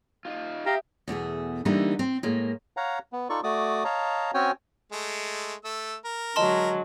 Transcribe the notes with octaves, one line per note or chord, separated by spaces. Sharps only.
D#4 F4
G4 E5 F5 G5 A#5 D#6
E2 B2 A3 G#4
D3 E3 G3 A3 A#3 D#4
C4
A2 G#3 A#3
C#5 F5 F#5 A#5
B3
D#4 F4 A4 D5 C#6
A3 F#4 D5 D6 D#6
C#5 D#5 F5 A5 A#5
C4 C#4 F#4 C#5 G5 G#5
G#3 A3
A3 E6
A#4
D3 F#3 G#3 D#5 A5 C6